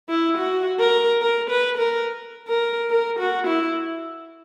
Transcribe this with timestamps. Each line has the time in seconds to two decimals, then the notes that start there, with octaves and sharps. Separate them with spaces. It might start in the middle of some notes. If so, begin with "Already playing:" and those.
0.09 E4
0.37 F#4
0.79 A#4
1.22 A#4
1.50 B4
1.78 A#4
2.48 A#4
2.90 A#4
3.19 F#4
3.47 E4